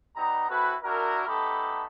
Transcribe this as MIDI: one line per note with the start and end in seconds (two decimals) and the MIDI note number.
0.15 0.49 55
0.15 0.49 59
0.15 0.49 63
0.15 0.49 82
0.49 0.75 60
0.49 0.75 64
0.49 0.75 66
0.49 0.75 69
0.49 0.75 71
0.83 1.23 62
0.83 1.23 64
0.83 1.23 66
0.83 1.23 70
1.27 1.84 57
1.27 1.84 59
1.27 1.84 63
1.27 1.84 67
1.27 1.84 69
1.27 1.84 83